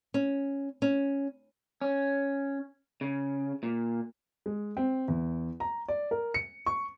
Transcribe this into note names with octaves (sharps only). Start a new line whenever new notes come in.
C#4
C#4
C#4
C#3
A#2
G#3
C4
E2
A#5
D5
A#4
C#7
C#6